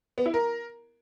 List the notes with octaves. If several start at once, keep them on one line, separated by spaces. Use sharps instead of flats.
B3
E4
A#4